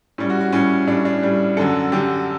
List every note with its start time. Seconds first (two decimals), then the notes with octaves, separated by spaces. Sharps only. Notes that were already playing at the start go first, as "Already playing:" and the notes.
0.18 A2 G3 C#4
0.30 F#4
0.41 F#4
0.52 A2 G3 C#4
0.87 A2 G3 D4
1.05 D4
1.23 A2 G3
1.57 F#2 D3 F#3 A4
1.92 F#2 D3 F#3 G4